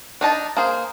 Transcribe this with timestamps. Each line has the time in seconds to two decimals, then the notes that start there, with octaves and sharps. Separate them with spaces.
0.21 D4 D#4 A5
0.57 A#3 G#4 C5